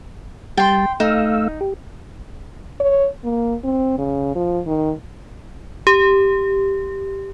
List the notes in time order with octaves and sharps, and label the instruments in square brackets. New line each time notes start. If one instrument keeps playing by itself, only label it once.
[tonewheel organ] G3 A5 [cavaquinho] G5 C6
[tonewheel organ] A3 F5 E6 [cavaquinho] D#4
[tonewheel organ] G4
[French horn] C#5
A#3
C4
C#3
F3
D#3
[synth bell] G4